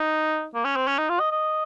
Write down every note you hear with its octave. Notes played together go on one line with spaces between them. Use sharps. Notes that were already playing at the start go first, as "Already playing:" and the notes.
Already playing: D#4
A#3
C#4
C4
C#4
D#4
F4
D#5
D#5